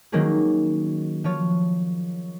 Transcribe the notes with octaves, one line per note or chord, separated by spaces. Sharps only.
D#3 F#3 G#3 A#3 C#4 G#4
F3 F4 C#5